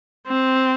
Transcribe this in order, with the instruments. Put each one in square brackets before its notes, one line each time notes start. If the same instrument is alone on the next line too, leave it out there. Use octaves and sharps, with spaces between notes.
[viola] C4